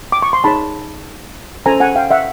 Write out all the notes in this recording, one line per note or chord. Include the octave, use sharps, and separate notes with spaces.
D6
C#6
C6
D#4 G#4 C#5 A5 B5
C#4 F4 A4 C5 G#5 A#5
F#5 G#5
F5 G5
E5 F#5